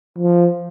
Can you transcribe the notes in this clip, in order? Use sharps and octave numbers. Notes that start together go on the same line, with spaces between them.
F3